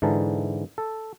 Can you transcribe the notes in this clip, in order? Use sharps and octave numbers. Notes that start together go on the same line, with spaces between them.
G#2 D3 E3 A5 A#5
A4